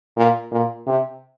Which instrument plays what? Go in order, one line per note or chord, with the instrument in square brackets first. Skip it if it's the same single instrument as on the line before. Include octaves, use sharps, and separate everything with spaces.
[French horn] A#2
A#2
C3